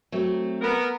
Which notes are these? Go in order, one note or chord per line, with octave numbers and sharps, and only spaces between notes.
F#3 A3 C4
B3 A#4